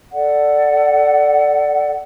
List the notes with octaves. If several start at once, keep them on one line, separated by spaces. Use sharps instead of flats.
A4 D5 F#5